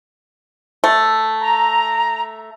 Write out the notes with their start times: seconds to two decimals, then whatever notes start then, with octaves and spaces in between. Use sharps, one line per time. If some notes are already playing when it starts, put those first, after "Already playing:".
0.84 A3
1.40 A#5